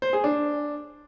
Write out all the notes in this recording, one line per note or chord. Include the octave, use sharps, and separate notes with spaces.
C5
G#4
D4